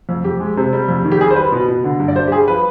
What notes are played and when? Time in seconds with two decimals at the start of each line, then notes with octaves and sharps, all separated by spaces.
0.09 F2
0.24 F2 G4
0.40 G#3
0.57 C3
0.73 G3
0.88 F2
1.05 D#3
1.12 G4
1.20 G3 G#4
1.31 C5
1.36 G3 B4
1.52 B2
1.68 B2
1.84 D3
2.00 G2
2.08 D5
2.16 G2 C5
2.27 G4
2.31 G3 G#4
2.48 F3 B4